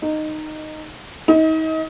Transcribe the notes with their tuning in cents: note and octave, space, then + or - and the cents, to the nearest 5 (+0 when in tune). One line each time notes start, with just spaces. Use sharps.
D#4 -10
D#4 +35